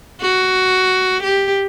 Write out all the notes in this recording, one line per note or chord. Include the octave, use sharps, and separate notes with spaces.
F#4
G4